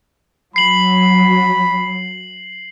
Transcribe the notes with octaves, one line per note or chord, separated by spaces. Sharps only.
F#3 B5 C7 F#7